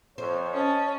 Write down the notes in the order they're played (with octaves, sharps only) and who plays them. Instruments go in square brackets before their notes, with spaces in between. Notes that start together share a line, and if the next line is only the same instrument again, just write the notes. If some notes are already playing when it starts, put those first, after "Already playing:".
[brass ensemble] F2 [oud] C5 [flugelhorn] C#5
[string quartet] C#4 [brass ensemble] D#5 A5